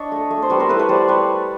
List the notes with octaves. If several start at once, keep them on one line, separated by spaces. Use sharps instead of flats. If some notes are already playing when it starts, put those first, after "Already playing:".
Already playing: D4 C#5 D#5
A3
A3
C5
G3 B4 C#5
A#4 C5
E4 A4 B4
B4 C#5
G3 C5 D5
G3 B4 C#5